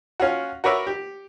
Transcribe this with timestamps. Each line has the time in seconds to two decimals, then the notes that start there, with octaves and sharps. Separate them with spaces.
0.20 C#4 F4 F#4
0.64 F#4 A#4 B4 C#5 D5 E5
0.87 G4